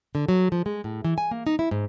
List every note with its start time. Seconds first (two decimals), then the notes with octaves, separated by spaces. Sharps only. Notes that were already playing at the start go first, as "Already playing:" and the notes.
0.15 D3
0.29 F#3
0.52 F3
0.66 G#3
0.84 A2
1.04 E3
1.18 G#5
1.31 A#3
1.46 D#4
1.59 E4
1.71 G#2